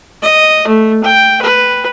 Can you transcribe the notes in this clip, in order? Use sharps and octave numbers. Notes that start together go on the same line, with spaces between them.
D#5
A3
G5
B4